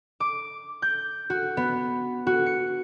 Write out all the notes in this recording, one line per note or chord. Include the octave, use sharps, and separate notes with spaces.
D6
G6
F#4
B3
F#4
C#7